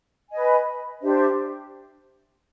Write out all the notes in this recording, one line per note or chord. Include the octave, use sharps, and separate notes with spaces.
B4 D#5 G#5
D4 G4 C5 E5